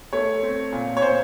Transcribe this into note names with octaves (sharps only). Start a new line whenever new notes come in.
A3 C#5
C4
A#2
C#5
A#2 C5